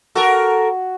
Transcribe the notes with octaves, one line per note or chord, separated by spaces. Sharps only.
F#4 A4 A#4